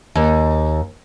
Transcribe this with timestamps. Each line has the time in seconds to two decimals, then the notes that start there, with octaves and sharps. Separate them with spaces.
0.15 D#2